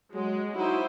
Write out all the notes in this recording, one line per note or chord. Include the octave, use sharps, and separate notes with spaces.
F#3 G#3
D#4 E4 F#4 C5